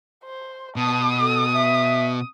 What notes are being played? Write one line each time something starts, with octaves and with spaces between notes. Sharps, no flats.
C5
B2 A5 D#6
A4
E5